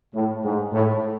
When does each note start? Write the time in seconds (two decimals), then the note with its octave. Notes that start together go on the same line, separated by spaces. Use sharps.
0.14 A2
0.44 G#2
0.73 A2